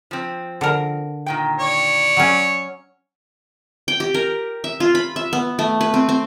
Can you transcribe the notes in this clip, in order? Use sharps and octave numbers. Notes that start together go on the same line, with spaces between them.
F3 C4
D3 A#4
A#2 D#3 G5
C#5 D5
F#3 C#4
G5
G4
A#4
E5
F4
B5
E5
B3
A3
B4
C4
C4